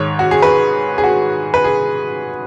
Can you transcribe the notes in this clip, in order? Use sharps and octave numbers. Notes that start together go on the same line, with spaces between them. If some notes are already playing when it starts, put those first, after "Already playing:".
Already playing: G#2 D#3 C#5
F#4
G#4
B4
G#4
F#4
B4
G#4